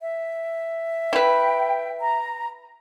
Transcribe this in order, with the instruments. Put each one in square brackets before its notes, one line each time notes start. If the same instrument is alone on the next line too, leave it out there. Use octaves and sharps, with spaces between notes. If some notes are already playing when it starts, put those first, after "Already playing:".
[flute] E5
[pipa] E4 B4 [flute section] G5
[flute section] A#5